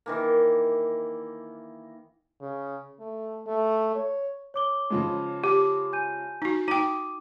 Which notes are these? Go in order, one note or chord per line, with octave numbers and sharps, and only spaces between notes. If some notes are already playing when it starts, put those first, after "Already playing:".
D#3 E3 A#3
C#3
A3
A3
C#5
C#5 D6 G7
C#3 F3 G#3
G4 D6
G#5 G6 D#7
D#4 F#4
D#4 G5 D6 D#6 D#7